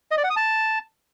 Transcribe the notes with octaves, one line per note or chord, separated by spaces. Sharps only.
D#5
D5
F#5
D#6
A5